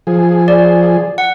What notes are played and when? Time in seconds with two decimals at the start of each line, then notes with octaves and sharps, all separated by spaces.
0.07 F3 G#4
0.48 D5
1.18 F#5